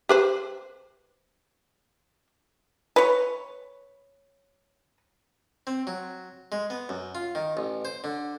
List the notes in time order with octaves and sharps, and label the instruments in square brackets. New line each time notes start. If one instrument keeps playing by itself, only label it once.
[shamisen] G4 B4 C5
[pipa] B4 C#5
[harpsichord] C4
F#3
G#3
B3
F#2
F4
D#3
A1
C5
D3